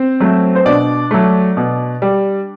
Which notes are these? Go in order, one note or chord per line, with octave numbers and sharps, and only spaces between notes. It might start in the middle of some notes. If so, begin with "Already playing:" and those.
Already playing: C4 C5
F#3 A3
C5
B2 D4 D5
F#3 A3
B2
G3